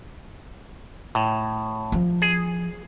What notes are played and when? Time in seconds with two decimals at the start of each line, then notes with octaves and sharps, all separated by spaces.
1.15 A2
1.92 F3
2.22 G#4